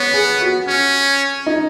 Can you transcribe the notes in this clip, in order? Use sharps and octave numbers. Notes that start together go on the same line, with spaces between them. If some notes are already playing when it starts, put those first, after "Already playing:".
Already playing: B3 C#5
G#4
F#4
C#4
D#4